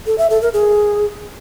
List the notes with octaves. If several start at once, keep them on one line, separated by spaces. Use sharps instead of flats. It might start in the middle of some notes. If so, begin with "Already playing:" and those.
A4
E5
A4
A#4
G#4